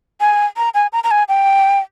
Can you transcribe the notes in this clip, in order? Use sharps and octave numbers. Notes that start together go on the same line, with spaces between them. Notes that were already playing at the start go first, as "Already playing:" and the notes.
G#5
A#5
G#5
A#5
A#5
G#5
G5